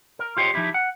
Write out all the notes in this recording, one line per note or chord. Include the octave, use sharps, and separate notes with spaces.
A#4
F4 G4 C5 C#5 D#5
F3 D#4 E4 G4
F#5